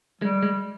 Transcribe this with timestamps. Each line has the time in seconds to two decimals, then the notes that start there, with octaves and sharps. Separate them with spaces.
0.21 G3 G#3
0.43 G#3